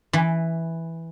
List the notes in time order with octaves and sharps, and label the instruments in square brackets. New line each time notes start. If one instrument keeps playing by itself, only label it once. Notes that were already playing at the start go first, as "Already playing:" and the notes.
[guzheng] E3